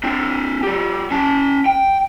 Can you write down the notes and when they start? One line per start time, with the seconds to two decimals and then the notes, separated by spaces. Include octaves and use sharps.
0.04 C4 D4
0.63 F#3 G4
1.11 C#4 A5
1.66 G5